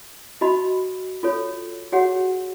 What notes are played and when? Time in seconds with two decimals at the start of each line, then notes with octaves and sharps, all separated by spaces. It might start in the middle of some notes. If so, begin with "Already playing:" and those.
0.41 F#4 D#5 B5
1.23 F4 A4 C#5
1.92 F#4 G#4 C#5 F#5